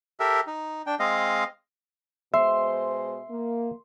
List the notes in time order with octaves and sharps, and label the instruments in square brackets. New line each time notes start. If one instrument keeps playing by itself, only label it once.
[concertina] G4 A4 A#4 E5
D#4
D4 G5
G#3 C4 D#5 F5
[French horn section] B2 G#3 C5 [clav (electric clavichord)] E5 [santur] C6
[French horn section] A#3